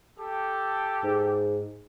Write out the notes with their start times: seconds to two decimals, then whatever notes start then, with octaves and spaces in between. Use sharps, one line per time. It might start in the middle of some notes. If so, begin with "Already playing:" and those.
0.18 G4 A4
1.03 G#2